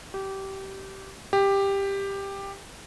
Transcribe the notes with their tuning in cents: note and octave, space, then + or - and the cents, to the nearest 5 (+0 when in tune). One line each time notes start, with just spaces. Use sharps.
G4 -20
G4 +10